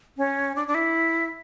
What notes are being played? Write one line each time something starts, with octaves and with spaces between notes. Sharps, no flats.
C#4
D4
D4
E4